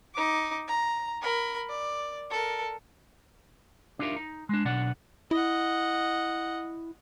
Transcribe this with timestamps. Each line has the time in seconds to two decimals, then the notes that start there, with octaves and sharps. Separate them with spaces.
0.14 D#4 D6
0.68 A#5
1.22 A#4 B5
1.69 D5
2.30 A4 A#4
3.99 D4 D#4 F4 G4 A#4 E5
4.16 D#4
4.49 G#3 D4
4.65 B1 B2 B3 D4 D5 F#5
5.31 E4 D#5 F#5